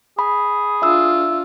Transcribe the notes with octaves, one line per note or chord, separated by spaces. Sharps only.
G#4 B5
D4 F4 E5 E6